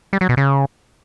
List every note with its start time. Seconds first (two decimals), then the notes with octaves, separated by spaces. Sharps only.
0.13 G3
0.21 F#3
0.29 B2
0.37 C#3